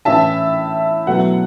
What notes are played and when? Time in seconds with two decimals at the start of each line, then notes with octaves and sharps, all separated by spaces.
0.05 A2 E3 C#4 E4 E5 A5
1.07 B2 F#3 A3 E4 F#5